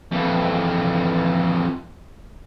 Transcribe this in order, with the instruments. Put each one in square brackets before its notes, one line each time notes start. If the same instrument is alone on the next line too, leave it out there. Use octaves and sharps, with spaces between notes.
[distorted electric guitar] F2 E3